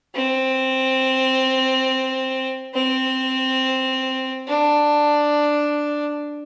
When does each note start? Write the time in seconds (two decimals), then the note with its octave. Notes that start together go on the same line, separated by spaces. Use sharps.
0.15 C4
2.74 C4
4.48 D4